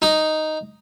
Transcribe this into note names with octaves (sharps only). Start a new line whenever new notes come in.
D#4